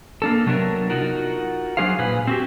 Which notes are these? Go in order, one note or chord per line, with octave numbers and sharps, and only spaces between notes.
A#3 D4 A4
C3 F#3 B3 D4 A#4
D#4 F4 F#4 A#4
F#3 D4 G#4 C5 F5
A#2 G#4 B4
C4 F#4 G4